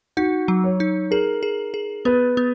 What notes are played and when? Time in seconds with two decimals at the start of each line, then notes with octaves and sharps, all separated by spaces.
0.17 D#4 F#4
0.48 F#3
0.64 C#5
0.80 D#4
1.11 G#4 A#4
1.43 G#4
1.74 G#4
2.05 B3 B4
2.37 B3